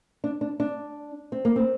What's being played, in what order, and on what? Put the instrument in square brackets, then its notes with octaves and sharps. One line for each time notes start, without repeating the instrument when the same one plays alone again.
[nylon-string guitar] D4
D4
D4
C4
A#3
C4